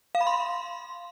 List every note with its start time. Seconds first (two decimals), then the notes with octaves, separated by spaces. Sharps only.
0.15 F5
0.21 B5
0.27 C6